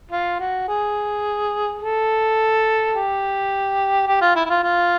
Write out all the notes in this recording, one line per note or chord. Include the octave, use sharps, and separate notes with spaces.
F4
F#4
G#4
A4
G4
G4
F4
E4
E4
F4
F4